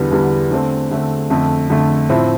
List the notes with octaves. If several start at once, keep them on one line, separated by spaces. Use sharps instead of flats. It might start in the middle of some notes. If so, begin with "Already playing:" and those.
Already playing: E2 D3 G3 B3
E2 D3 G3 B3
D3 A3 C4
D3 A3 C4
F2 D3 A3
F2 D3 A3
A2 F3 C4 E4